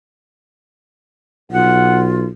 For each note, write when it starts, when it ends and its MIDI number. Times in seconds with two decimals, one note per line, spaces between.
1.52 2.28 35
1.52 2.26 65
1.52 2.05 78